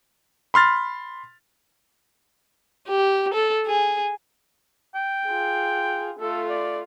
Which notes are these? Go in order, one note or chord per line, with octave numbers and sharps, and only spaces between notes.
B5 C6 F6 A6
G4
A4
G#4
G5
F4 G#4
A3 F4 A4
D5